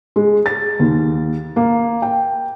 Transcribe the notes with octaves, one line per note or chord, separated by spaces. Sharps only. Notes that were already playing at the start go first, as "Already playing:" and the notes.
G#3
A6
D#2
A#3
G5